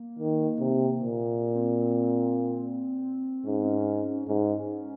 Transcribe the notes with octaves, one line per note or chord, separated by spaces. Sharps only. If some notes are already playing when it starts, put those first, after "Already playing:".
Already playing: A#3
D#3
C3
A#2
C4
G#2 C#4
C4
C#4
G#2 C#4